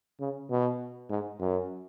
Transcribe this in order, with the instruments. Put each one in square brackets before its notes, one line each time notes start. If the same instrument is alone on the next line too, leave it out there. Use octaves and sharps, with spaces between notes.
[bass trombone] C#3
B2
G#2
F#2